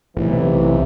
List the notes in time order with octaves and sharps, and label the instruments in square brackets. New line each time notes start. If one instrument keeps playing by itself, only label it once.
[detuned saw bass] B1 [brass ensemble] A2 C3 E3